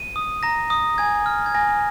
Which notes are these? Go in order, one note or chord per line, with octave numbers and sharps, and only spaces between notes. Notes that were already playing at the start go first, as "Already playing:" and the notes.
Already playing: D#7
D#6
A#5 A#6
D#6
G#5 G#6
F6
G#6
G#5 A#6